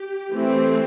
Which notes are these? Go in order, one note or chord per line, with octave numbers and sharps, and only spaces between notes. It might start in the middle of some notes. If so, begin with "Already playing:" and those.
Already playing: G4
E3 A3 C4